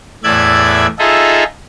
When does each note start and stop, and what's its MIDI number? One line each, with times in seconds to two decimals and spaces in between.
0.24 0.87 40
0.24 0.87 45
0.24 0.87 74
0.24 0.87 76
0.24 0.87 90
0.24 0.87 92
0.99 1.44 63
0.99 1.44 65
0.99 1.44 68
0.99 1.44 69
0.99 1.44 75
0.99 1.44 76